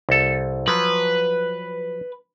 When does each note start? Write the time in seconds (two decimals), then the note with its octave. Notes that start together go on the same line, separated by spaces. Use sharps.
0.09 C2 A4
0.68 F3 F#3 B4